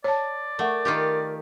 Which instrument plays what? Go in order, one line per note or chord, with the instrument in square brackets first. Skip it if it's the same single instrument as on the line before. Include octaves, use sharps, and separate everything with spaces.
[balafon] C#5 A5 [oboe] D5
[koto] A3 [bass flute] A#4 [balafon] F#5 C#6
[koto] D#3 F4 G4